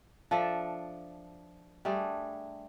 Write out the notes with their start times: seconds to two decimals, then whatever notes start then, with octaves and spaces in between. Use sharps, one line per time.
0.31 F3 D4 A4 E5
1.85 G3 A3 D4 G#4